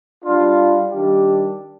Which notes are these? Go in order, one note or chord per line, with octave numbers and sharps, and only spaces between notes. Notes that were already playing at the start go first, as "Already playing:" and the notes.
G3 D4 F4
D#3 G3 D4 G4